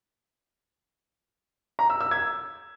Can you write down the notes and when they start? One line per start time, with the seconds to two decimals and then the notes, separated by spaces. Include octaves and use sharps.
1.79 A#5
1.90 E6
2.01 E6
2.11 G#6